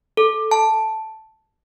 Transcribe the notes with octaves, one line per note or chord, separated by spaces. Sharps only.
A4
A5